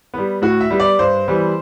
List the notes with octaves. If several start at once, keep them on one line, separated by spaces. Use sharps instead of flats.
G3 B3
A2 F#4
E5
G3 B3
D5
G2 C5
E3 G3 B3